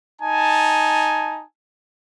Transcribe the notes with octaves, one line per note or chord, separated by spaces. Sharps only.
D#4 G#5 A5